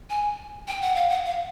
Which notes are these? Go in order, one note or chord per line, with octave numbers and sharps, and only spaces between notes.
G#5
G5
F#5
F5
F#5
F5